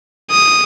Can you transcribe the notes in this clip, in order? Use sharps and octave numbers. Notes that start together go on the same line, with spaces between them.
D#6